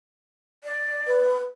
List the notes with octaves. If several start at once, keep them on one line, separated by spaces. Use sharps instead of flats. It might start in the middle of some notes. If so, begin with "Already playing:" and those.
D5
B4